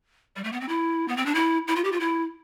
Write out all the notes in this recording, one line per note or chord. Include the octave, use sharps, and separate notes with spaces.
G3
A3
B3
C4
E4
B3
C4
D4
E4
E4
F4
G4
F4
E4